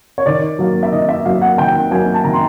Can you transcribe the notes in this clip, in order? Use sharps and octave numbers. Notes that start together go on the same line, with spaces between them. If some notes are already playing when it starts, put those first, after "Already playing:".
C#5
D#3 D5
F#3 A#3
E5
D#3 D#5
E5
F#3 A#3 F5
F#5
D#3 G5
F#3 A#3 G#5
A5
D#3 A#5
C6